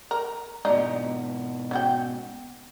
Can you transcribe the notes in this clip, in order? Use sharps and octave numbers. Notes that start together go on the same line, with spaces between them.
A#4
G#2 B2 D4 D#4 F4
C#4 F#4 G5